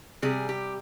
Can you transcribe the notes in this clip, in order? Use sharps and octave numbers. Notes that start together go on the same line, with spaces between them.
C3 G3 G#4
G4